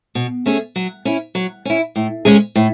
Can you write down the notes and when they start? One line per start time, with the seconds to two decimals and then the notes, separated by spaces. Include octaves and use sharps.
0.15 B2
0.46 A3 C#4 G#4
0.76 F#3
1.05 C#4 E4
1.35 F#3
1.65 C#4 E4
1.96 A2
2.25 G#3 C#4 G#4
2.56 A2